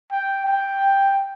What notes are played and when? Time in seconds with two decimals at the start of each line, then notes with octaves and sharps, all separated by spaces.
0.12 G5
0.46 G5